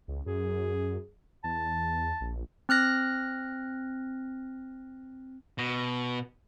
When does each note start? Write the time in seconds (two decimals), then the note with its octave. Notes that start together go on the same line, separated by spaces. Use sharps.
0.08 C#2
0.26 F#2 G#4
1.44 E2 A5
2.21 A#1
2.69 C4 F6 F#6 A#6
5.58 B2